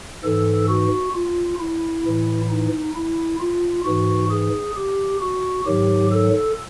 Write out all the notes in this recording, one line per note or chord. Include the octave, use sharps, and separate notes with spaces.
G#2 E3 A4
F#4
F4
E4
A2 E3
D#4
E4
F4
G#2 E3 F#4
G#4
G4
F#4
G#2 D#3 F#3 G4
A4